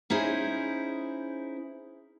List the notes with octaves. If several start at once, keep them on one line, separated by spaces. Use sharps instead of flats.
C#4 D#4 E4 G#4 C5